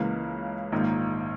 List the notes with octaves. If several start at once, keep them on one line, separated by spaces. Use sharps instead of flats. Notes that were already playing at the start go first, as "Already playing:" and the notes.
Already playing: C#2 C#3 E3 A#3
A#1 G#2 D#3 A#3